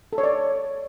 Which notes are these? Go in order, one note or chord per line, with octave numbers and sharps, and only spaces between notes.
A4
C#5
D5